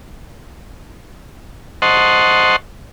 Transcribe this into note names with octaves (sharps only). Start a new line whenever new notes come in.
C5 D#5 F#5 A5 C6 C#6